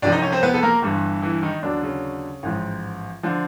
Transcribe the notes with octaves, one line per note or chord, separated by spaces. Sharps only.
C2 C3 F3 D4 D5
D#4 D#5
C#4 C#5
C4 C5
B3 B4
A4
A#3 A#4
G1 G2 E3
E3 E4
D#3 D#4
D#2 D3 F#3 D4
C#3 C#4
A1 G#2 F3
D3 F3